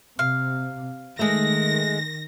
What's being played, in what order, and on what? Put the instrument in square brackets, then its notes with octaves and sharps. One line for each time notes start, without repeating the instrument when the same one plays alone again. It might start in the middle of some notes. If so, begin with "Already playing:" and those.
[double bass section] C3 [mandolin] F5
[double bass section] D#3 [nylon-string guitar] G#3 A3 [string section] A#6